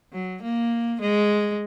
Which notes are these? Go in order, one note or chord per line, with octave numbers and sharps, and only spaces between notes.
F#3
A#3
G#3